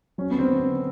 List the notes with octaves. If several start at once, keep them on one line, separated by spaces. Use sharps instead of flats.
F#3 C#4
B3
D3 C4
D3